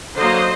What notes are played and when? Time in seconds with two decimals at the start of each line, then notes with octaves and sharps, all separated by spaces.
0.17 D3 F#3 A#3 C5 D#5